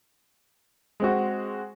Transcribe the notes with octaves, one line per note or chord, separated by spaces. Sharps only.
G#3 C4 F#4